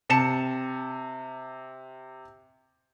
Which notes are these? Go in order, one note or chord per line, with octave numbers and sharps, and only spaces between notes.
C3 A5 C#7 E7